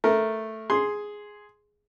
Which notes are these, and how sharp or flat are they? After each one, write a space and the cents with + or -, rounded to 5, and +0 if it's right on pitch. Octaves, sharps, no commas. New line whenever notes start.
A3 +0 A#4 +0
G#4 +0 C6 +0